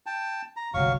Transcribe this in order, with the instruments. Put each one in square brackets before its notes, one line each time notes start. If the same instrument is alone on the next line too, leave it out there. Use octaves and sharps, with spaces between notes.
[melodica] G5 A5
A#5
[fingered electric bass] G1 C2 [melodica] F#3 F5 C#6